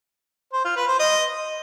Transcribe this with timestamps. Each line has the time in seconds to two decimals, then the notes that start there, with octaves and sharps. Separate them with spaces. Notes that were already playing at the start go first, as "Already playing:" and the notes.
0.53 C5
0.65 F4
0.76 B4
0.88 C5
0.99 D#5